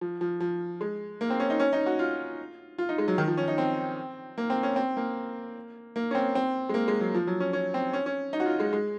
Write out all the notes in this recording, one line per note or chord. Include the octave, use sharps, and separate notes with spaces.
F3
F3
F3
G#3
A#3
C4
C#4
D#4
C#4
D#4
F#4
F4
F4
D#4
G#3
F#3
D#3
F3
C#4
D#4
C4
A#3
C4
C#4
C4
A#3
A#3
C#4
C4
C4
G#3
A#3
G#3
F#3
F3
F#3
C#4
C#4
C4
C#4
C#4
D#4
F#4
F4
G#3
G#3